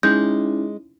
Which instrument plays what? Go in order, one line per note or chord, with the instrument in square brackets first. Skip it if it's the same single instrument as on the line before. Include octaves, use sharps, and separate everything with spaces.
[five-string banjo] G#3 [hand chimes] C#4 D#4 E4 [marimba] G6